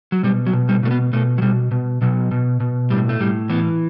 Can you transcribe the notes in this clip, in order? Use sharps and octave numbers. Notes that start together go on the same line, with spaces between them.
F#3
B2 G3
F#3
B2
G3
B2 A3
B3
B2 A3
F#3
B2 G3
B2
B2 F#3
B2
B2
A2 G3
A3
A2 G3
E3 B3